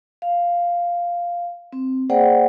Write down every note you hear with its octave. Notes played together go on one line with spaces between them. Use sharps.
F5
C4
A#3 G#4 C5 D5 F#5 G5